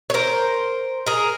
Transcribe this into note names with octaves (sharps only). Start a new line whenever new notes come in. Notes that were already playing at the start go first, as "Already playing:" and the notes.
C#5
A#4 C5
G#4 A#4